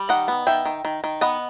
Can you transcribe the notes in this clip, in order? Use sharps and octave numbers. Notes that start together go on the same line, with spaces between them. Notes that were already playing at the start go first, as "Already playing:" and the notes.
Already playing: G3
D#3 D#5 F#5
B3
D#3 E5 G5
D#3
D#3
D#3
B3 D#5 F#5